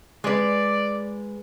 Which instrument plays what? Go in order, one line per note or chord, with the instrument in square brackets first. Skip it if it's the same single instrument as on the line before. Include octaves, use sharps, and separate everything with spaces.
[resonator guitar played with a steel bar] G#3 B4 [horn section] D5